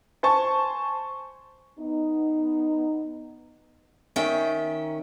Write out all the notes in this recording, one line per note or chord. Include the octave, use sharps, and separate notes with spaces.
C5 G#5 A5 C#6
B3 D#4
D#3 C#4 E5 G5